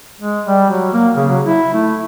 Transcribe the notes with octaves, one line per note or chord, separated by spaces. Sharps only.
G#3
G3
F#3
A#3
C#3
F#3
E4
A3